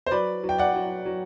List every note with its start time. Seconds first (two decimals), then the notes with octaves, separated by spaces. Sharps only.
0.07 C5
0.11 F#3 B4 D5
0.44 F#3
0.49 G5
0.58 D5 F#5
0.75 F#3
1.06 F#3